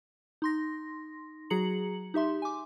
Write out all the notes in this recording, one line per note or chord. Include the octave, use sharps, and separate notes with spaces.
D#4 C6 A#6
F#3 F#4 G#4 A#5 C#7 F#7
D#4 G4 E5 C6
G#5 D6